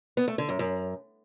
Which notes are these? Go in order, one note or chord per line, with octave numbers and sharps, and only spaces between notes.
B3
A3
D3
F#2
F#2